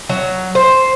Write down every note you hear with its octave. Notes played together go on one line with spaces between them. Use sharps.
F#3
C5